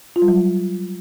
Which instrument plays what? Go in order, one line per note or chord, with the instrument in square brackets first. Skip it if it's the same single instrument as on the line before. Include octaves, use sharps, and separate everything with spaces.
[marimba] F4
G3
F#3